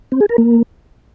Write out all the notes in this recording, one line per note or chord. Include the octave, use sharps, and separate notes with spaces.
C4
G#4
A#4
A#3